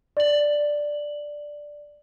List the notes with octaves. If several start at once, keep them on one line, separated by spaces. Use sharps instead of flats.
D5 F#7